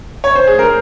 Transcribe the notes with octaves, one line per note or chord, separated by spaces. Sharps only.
C#5
C5
G#4
A#4